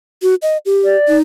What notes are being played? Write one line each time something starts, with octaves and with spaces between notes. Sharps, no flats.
F#4
D#5
G4
D5
D#4